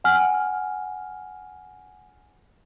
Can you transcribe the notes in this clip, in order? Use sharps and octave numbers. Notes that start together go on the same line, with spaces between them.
F#5 G#5 F6